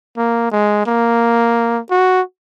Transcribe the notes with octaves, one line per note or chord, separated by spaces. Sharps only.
A#3
G#3
A#3
F#4